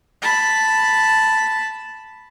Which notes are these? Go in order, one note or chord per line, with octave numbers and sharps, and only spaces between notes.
A5 B5